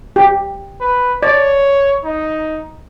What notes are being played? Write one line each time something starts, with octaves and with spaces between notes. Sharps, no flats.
G4
B4
C#5 D5
D#4